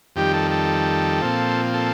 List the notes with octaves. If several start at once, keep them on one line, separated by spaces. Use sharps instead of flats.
F2 D#3 G3 G4
A4
A4
A#2 F3 C4
A4